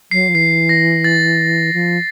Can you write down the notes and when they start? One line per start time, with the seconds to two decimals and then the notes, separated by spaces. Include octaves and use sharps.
0.11 F#3 C7
0.29 F3
0.35 E3 C7
0.69 A#6
1.04 A6
1.73 F3